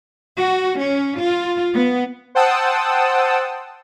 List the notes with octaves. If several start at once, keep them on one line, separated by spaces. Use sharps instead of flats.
F#4
C#4
F4
B3
C5 F#5 G5 A5 D#6 E6